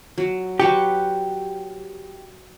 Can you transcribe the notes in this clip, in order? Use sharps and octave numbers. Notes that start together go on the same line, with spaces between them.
F#3
F#3 G4 B4 C#6